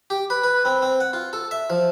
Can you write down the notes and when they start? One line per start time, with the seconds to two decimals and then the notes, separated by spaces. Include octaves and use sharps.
0.10 G4
0.30 B4
0.44 B4
0.65 C4
0.82 C4
1.00 F#5
1.13 F4
1.33 A4
1.51 E5
1.70 F3